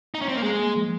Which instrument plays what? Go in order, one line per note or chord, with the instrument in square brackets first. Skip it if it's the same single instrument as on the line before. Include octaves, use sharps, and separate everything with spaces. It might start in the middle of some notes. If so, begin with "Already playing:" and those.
[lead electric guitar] D#4
C#4
C4
A#3
[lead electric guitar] G#3 [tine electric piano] G#4
[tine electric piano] A#3
F3